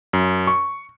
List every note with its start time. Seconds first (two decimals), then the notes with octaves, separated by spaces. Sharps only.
0.13 F#2
0.47 C#6